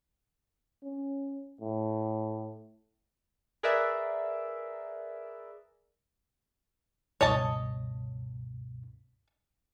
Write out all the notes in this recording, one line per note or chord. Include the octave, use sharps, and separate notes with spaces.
C#4
A2
G#4 A#4 B4 D5 E5
C#2 G2 B2 C#5 D#5 A5